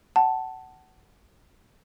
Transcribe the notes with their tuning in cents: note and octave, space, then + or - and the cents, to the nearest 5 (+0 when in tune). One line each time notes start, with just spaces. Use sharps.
F#5 +25 A5 +0